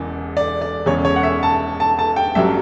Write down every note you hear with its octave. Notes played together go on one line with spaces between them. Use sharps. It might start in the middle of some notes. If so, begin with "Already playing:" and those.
Already playing: E1 E2 C#3 E3
D5
D5
E1 E2 C#3 C#5
C#5
F#5
E5
A5
A5
A5
G5
A1 G2 F#3 E5